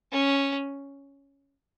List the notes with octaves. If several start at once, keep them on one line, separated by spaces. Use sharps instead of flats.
C#4